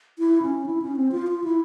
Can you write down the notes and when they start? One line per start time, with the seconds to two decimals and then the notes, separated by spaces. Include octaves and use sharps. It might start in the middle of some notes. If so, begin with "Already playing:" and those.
0.19 E4
0.42 C#4
0.66 E4
0.82 C#4
0.96 C4
1.12 F4
1.27 F4
1.44 E4